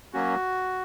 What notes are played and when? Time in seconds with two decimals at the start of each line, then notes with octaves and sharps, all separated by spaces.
0.13 F#3 A#3 C#4 F#4